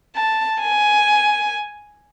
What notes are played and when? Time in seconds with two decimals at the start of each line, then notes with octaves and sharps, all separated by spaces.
0.15 A5
0.60 G#5